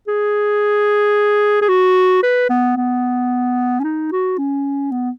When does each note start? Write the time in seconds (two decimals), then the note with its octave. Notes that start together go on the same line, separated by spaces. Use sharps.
0.08 G#4
1.61 G#4
1.69 F#4
2.23 B4
2.50 B3
2.77 B3
3.80 C#4
3.84 D#4
4.12 F#4
4.38 C#4
4.92 B3